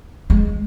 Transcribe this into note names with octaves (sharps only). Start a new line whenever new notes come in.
G#3